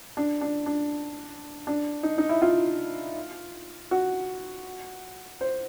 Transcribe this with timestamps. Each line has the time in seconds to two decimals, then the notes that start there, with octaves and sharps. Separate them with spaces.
0.17 D4
0.41 D4
0.66 D4
1.67 D4
2.03 D#4
2.18 D#4
2.29 E4
2.42 F4
3.91 F#4
5.41 C5